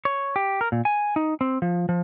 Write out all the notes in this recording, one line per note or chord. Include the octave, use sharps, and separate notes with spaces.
C#5
G4
A#4
A#2
G#5
D#4
C4
F3
F3